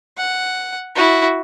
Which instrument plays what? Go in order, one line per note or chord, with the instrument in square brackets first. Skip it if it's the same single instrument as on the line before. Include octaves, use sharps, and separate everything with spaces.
[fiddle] F#5
E4 F#4